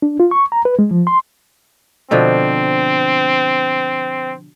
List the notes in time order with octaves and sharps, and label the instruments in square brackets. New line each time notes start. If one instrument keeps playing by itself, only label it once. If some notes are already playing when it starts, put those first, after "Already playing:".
[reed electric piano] D4
F4
C#6
A#5
B4
G#3
F3
C6
[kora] B2 D3 F3 [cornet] C4